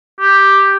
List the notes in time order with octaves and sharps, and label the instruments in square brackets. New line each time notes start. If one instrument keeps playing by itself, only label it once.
[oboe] G4